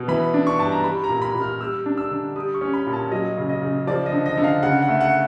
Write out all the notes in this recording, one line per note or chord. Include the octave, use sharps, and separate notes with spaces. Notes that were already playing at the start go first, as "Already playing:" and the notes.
Already playing: B2
E3 B5
D4
C#6
G2 A5
A#5
G3 B5
A#5
A#2
B5
A#2
F6
G3 E6
D4
E6
D3
G3 D#6
C#6
C#4
B5
A#2
A5
F#3 D#5
C#3
D#5
C#3
F3 D5
D#5
D3
D#5
D3
F5
C#3 F#5
F#5
A3
F#5